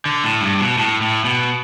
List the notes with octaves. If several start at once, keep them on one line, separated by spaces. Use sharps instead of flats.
D3
A2
G2
B2
A2
A2
B2